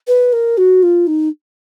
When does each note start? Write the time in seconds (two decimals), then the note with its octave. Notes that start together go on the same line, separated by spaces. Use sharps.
0.07 B4
0.32 A#4
0.57 F#4
0.82 F4
1.07 D#4